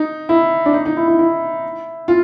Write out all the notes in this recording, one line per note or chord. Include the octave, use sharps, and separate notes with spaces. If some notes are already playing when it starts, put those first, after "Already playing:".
Already playing: D#4
E4
D4
D#4
D#4
E4
E4
E4
F4